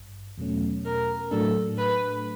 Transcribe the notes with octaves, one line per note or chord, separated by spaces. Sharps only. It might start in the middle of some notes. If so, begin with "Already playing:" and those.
Already playing: G#1 G2
E2 B2 F#3 A3 C#4
A#4
A2 F#3 A3 D4 A4
B4